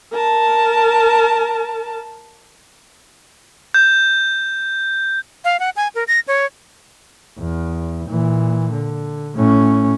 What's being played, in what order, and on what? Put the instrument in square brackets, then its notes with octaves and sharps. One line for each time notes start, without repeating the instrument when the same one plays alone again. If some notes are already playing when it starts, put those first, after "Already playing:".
[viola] A#4 A5
[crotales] G6
[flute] F5
F#5
G#5
A#4
A#6
C#5
[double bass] E2
A#2 E3
D3
A2 C#4